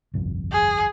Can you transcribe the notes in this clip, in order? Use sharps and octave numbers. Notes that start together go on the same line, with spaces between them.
G1 C2 F2
G#4